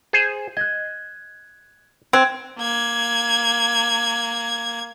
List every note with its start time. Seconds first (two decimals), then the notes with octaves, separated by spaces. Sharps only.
0.13 G#4 C5
0.57 D#5 F#6 G#6
2.13 C4 F#6 G#6 D7
2.59 A#3 G#6